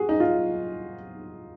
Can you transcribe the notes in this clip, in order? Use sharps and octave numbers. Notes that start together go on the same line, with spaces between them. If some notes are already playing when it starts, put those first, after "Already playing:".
Already playing: F#4 G#4
D#4
F4